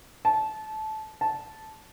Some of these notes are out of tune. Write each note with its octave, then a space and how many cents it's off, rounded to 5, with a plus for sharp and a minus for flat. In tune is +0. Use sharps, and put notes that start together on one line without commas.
A5 -20
A5 -10